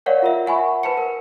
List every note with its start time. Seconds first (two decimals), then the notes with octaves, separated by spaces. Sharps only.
0.06 A#4 C#5 D5 F5 F#5
0.22 F4 A#4 E5
0.46 E5 F#5 G#5 B5 C#6
0.83 B4 C5 F#5 A5 C#7
0.97 A#4